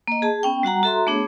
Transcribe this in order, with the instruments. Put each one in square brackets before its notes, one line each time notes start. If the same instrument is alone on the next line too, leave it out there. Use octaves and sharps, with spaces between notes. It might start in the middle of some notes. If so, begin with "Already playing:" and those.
[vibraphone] A#3 D#5
G#4 A5
B3 C#4 G5
G3 F#4 F#5 A#5
F#4 A4 E5 A#5 C6
A3 B3 D4 G#4 C#5